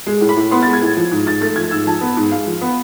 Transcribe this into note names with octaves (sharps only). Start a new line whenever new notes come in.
G#3
A2
B5
A2
B3 C6
A6
G#3
G#6
A2
F3
G#2
G#2 A6
A3 A6
F3 G#6
G#2 E6
F3 A5
B3
G#2
G#3 F5
F3
B3